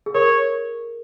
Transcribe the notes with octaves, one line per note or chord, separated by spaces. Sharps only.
G#4
A#4 C#5